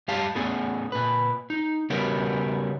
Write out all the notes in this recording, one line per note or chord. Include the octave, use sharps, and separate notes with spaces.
G2 G4 F5 A5
A2 B3 C#4 G#4 A4
A#2 B4
D#4
C#3 G3 B3 C#4 F#4 A#4